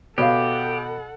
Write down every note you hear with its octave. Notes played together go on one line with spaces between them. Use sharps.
B2 G4 A4 C#5 F5 F#5